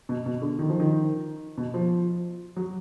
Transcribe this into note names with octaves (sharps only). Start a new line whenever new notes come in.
B2
B2
D3
D#3
F3
D#3
B2
F3
F#3